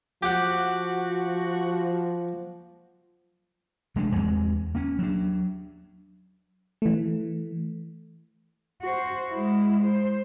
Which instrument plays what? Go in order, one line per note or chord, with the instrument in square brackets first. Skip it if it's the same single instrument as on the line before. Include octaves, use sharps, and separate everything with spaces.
[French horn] F3 [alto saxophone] F#4 [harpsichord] G4 F#5
[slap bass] F1 G#3 A3 D4
E2 G#3 C4
A#3 C#4
F#3 D4
[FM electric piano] E3 A3
[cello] F#4 C5
G#3 E4
C5